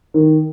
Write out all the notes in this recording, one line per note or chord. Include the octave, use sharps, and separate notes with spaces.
D#3